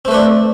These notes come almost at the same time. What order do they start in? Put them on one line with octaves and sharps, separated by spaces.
C4 A3 B4 D4